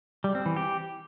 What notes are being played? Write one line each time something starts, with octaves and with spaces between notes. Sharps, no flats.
G3
C4
E3
G4